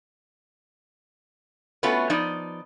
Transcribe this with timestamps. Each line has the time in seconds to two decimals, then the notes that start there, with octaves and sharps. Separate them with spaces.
1.83 A3 B3 C#4 F4 F#4 B4
2.10 F3 B3 D#4 D5